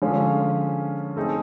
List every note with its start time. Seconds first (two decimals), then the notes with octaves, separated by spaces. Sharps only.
0.02 D3 F3 G#3 C#4 F4
1.17 A3 C4 D#4 G#4